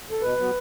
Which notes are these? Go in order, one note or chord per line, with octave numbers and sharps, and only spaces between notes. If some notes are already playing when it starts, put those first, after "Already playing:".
A4
B2 B4
F#3 B3